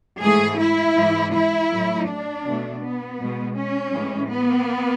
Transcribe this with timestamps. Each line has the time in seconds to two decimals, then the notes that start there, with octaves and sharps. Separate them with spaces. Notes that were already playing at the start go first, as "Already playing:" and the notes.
0.22 G#2 E3 A3 G#4
0.59 E4
0.96 G#2 E3 G#3
1.33 E4
1.70 A2 F#3 A3
2.07 D4
2.45 B2 A3
2.81 B3
3.19 B2 G#3
3.56 C#4
3.92 A2 E3 G#3
4.30 B3